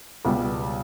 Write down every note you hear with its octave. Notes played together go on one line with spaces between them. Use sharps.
C#2 B2 G3